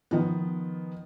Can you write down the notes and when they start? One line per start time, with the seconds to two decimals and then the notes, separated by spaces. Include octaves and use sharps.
0.11 D#3 F3 B3